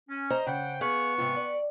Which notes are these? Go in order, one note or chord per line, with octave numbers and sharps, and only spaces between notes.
C#4
C5 D#5 A#5
C#3 C5 F#5 G5
B3 G#4 B4 F5 C#6
G#2 C3 F4
D5